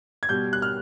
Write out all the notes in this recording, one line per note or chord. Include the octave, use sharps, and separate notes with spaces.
G#6
B2 G3 G6
F#6
F6